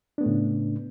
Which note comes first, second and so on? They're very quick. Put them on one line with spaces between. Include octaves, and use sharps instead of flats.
D4 B3 A3 A2 C#3